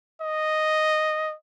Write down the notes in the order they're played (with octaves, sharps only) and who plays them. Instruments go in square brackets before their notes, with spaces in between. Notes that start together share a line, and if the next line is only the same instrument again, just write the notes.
[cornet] D#5